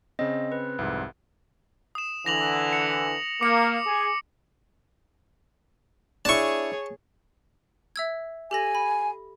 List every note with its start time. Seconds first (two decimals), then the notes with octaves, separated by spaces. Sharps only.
0.19 C#3 C4 D#5
0.52 B4
0.79 C2 F2 G#2
1.95 D#6 E7
2.26 D3 E3 A#6 F7 F#7
2.73 C#7
3.41 A#3 D6 C#7
3.86 G#4
6.25 D4 E4 G#4 C#5 A5 C#6
7.96 E5 E6 G#6
8.51 G4 A4 G#5 A#6
8.75 B5